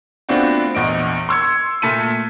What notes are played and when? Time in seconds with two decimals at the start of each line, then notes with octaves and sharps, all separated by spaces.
0.29 A3 B3 C4 D4 F4 F#4
0.75 A#1 E2 D#5 D7
1.29 C6 E6 G#6 C#7
1.82 A#2 A3 A5 B6 C#7 D#7